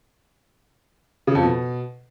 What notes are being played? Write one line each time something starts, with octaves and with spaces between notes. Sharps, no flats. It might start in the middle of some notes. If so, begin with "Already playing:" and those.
C#3
F2
B2